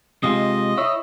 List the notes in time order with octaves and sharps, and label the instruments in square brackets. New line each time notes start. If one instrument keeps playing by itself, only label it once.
[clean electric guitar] C3 G#3 F4 [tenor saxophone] D#5
[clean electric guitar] E4 C#5 E5